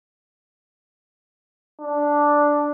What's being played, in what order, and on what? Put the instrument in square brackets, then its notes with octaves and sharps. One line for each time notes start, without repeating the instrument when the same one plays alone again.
[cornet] D4